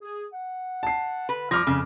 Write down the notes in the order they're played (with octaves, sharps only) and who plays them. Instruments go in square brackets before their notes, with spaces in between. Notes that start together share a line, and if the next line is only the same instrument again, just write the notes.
[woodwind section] G#4
F#5
[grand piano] A5 C7
[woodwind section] D3 [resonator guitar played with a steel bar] B4
[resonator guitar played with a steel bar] F3 [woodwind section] G3 B5 [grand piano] D6 F6 A#6
[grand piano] F2 [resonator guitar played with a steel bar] C#3